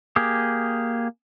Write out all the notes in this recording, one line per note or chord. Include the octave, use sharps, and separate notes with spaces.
A#3 G4 G#4